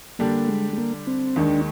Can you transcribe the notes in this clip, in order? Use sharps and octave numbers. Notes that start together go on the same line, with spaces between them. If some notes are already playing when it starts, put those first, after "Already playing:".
D3 G3 A#3 D4 G4
G#3
G#3
A#3
C4
D#2 D#3 G#3 D4